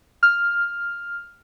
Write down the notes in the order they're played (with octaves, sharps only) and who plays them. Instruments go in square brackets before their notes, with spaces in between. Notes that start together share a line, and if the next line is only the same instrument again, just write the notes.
[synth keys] F6